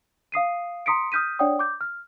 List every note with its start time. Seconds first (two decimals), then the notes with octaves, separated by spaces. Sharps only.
0.32 F5 D#6 C7 D#7
0.86 A#5 C6 D#6 B6 C#7 D7
1.12 D#6 F6 G6 B6 D#7
1.39 D4 C#5 D5 F#5 G5 D#6
1.59 D6 G6
1.81 F6